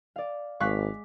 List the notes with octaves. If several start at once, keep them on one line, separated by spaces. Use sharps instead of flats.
D5 F5
G#1 G#3 F5 C#6 D6 F#6 B6